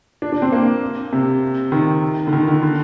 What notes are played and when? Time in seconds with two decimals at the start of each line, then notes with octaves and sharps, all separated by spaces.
0.22 D4
0.32 D4
0.42 C4
0.52 A#3
1.13 C3
1.72 D#3
2.27 D3
2.33 D#3
2.48 D3
2.63 D3